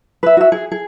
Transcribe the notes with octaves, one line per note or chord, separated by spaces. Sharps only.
B4 E5
F#4 E5
G#4
G#4